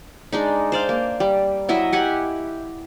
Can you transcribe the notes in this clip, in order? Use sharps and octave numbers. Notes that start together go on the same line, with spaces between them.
G#3 D4 D#4
C5 D5 F5
A#3
G3
F#3 E4 D#5 E5
G4 F#5 G#5